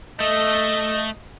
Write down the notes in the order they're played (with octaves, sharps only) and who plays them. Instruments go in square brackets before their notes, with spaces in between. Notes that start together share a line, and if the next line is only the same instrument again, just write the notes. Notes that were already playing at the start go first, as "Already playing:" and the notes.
[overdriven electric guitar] A3 [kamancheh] D#5